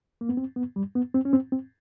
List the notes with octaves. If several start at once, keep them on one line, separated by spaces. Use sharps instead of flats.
A#3
B3
C4
B3
G3
B3
C4
C#4
C4
C4